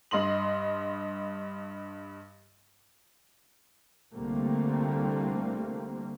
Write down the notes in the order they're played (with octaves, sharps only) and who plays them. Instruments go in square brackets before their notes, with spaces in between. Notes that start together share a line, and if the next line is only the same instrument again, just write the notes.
[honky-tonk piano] G2 D#5 C6 F#7
[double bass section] C2 D3 G3 A3 A#3 C4